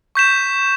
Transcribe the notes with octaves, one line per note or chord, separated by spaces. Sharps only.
C#6 G6 B6 E7